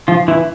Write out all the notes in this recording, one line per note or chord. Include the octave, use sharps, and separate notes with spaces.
F3 F4
E3 E4